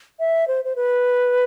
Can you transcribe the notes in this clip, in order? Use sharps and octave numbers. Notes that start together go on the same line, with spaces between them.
E5
C5
C5
B4